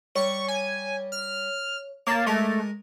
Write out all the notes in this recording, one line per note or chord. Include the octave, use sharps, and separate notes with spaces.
G3 C#5 C#6
G#5
F6
A#3 C#5 A5 D6 A6
G#3 A3 A#4 G#5